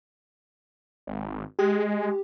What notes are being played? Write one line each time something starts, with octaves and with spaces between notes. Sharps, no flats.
G#1
G#3 G4